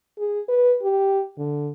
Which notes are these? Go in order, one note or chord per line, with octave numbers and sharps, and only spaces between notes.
G#4
B4
G4
D3